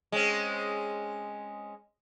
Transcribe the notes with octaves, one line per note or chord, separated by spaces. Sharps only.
G#3 C4 C#4